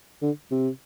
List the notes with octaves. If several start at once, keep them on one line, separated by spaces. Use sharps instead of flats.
D3
C3